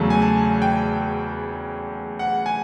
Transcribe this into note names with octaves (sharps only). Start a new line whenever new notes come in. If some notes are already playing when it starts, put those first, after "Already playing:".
Already playing: E2 C#3 F#3 A3 A5
G#5
A5
G5
F#5
G#5